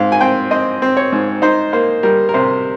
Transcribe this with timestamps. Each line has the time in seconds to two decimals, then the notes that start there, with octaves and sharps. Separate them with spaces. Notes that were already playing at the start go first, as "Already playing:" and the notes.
Already playing: G#2 C4 F5
0.12 G#5
0.21 C4 G5
0.51 C4 D#5
0.82 C4
0.97 C#5
1.12 G#2
1.42 D#4 C5
1.73 A#3 C5
2.03 G3 A#4
2.29 A#4
2.34 C3 C5